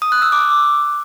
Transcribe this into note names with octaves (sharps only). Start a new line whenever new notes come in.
D#6
F#6
E6
D6